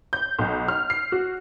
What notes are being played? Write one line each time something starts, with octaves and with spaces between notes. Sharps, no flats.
G6
B1
F6
C7
F#4